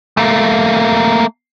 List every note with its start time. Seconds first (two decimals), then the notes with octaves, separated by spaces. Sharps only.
0.17 A3 A#3